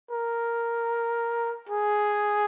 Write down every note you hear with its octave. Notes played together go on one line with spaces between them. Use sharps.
A#4
G#4